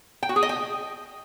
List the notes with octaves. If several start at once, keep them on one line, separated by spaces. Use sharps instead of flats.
G5
F#4
G#4
D#5
G5